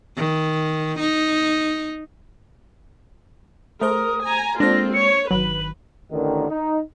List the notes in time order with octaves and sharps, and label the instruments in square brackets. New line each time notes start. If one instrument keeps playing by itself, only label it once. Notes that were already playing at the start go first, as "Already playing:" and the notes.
[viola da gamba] D#3
D#4
[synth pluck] A3 [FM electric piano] G#4 C5 [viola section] A#4 [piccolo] D#6
[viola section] G#5 A#5
[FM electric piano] G#3 A4 C5 [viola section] A#3 C4 F4 [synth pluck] D4 [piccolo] A#6
[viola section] C#5 [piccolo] C#7
[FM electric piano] G1 D#3 [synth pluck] F#3 [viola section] B4 [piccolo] F#7
[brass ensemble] A1 D3 D#3
D#4